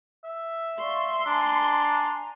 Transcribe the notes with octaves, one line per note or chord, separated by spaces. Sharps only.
E5
D5 F5 C6 C#6
D4 G#5 A#5